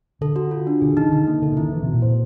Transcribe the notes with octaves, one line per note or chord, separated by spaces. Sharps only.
D3 A4
F#4
F4
D4
D3 G#4
D#3 D#4
D3 D#4
A#3
D3 A4
C#3
E4
D#3
E3 B4
C3
F#4
A#2
C5